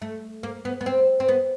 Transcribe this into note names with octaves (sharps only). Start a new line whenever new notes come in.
A3
A#3
B3
B3
C4
C4
B3